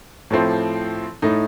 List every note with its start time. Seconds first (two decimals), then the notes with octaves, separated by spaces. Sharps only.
0.31 A2 F3 A3 C4
1.22 A2 A3 D#4